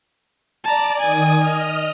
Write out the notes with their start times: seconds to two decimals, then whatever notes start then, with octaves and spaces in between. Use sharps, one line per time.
0.64 D5 A5 A#5
0.99 D#3 G#5 D#6
1.35 D#5 F6